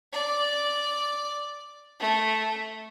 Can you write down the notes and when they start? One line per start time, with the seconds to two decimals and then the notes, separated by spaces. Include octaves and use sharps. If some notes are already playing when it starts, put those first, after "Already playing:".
0.13 D5
2.00 A3